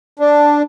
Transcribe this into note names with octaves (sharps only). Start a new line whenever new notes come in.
D4